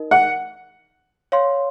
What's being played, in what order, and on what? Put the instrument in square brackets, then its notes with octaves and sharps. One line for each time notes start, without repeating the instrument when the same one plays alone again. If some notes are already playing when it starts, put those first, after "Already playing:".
Already playing: [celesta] D#4 A#4 D#5
[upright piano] F#5
[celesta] C#5 F5 C6